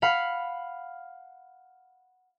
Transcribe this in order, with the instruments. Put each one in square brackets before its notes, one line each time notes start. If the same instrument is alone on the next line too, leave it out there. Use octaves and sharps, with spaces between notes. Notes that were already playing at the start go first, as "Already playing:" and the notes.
[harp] F5 F#5 B5